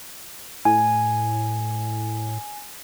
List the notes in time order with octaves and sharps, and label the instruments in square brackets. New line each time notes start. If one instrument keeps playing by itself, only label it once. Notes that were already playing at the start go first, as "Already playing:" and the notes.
[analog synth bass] A2 [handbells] G#5